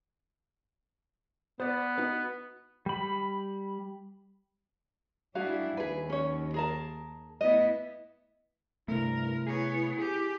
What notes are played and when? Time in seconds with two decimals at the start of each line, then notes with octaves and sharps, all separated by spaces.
1.60 B3 C5 D5
1.98 D#4 F#4 B4
2.86 G3 B5
5.35 G3 D4 E4 F#4 G#4 F5
5.77 D#2 G#4 B4
6.10 C#4 C#5
6.54 G#4 A#4 A5
7.41 A3 B3 E4 D#5
8.88 G2 C3 A3 E4 A#4
9.47 B3 G#4 C#5
9.98 G4 G#4